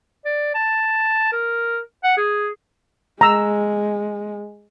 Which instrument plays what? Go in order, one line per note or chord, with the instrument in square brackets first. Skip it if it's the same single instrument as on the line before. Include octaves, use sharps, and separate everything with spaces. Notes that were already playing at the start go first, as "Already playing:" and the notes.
[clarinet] D5
A5
A#4
F#5
G#4
[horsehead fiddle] G#3 [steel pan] A#5 E6